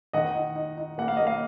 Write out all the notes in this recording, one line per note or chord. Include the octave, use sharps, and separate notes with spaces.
D#3 D#5 F#5
D#4
D#4
D#4
A#3 F#5
F5
A#3 D#5
F5